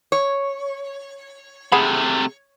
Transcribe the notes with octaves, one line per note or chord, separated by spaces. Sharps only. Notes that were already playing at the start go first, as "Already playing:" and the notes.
C#5
C3 A3 G#4 F#5 B5